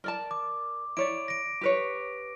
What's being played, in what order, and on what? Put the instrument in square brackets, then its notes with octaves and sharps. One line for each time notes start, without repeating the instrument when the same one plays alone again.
[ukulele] A#4 D5 A5
[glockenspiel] D6
[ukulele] E4 C#5 D5 [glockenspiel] D7
[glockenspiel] A#6 D7
[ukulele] G4 B4 C#5